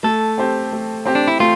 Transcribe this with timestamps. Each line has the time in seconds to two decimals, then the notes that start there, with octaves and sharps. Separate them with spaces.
0.03 A3 A4
0.38 C4 G4 C5
0.72 A3
1.05 C4 G4 C5
1.15 D4
1.28 E4
1.40 A3 F4